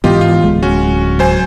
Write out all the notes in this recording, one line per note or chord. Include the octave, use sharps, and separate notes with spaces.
G#2 E3 B3 F4 G4 D#5
F4
D1 G#3
C#4 F#4
F#3 C5 G#5